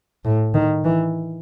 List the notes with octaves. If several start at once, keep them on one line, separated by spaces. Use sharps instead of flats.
A2
D#3
E3